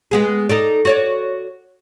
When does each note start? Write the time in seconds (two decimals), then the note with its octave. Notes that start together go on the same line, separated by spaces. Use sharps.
0.11 G#3 B3 G#4
0.49 D#4 A4 D5
0.85 F#4 C#5 D5